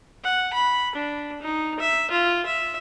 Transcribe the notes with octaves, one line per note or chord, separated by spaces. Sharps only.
F#5
B5
D4
D#4
E5
F4
E5